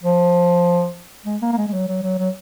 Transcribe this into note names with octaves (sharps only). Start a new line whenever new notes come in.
F3
G#3
A#3
A#3
G#3
G#3
F#3
F#3
F#3
F#3